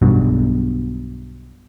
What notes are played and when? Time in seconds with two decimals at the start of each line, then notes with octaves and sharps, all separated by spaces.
0.02 B1 G2 B2